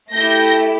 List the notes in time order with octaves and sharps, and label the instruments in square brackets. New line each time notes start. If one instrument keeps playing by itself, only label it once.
[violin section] A3 E4 G4 G6 A#6